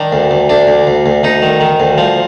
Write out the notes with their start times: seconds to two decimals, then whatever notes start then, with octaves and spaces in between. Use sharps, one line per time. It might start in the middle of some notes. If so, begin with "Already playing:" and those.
Already playing: D#3 D4
0.12 D2
0.31 D2
0.49 D2 D4
0.67 D2
0.87 D2
1.06 D2
1.23 D2 D#4
1.42 D#3
1.60 D#3
1.80 D2
1.98 F3